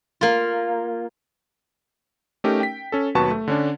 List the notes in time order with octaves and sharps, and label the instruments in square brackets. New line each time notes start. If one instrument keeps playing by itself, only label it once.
[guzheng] A#3 F4
[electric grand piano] A3 C#4 D#4 G4 A#4
G5 B6
C#4 A4
D#2 B2 F#3 B4 A5 C#6
A3
D3 C#4 D4